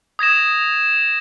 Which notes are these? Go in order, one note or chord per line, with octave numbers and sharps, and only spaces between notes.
D#6 G#6 A#6 E7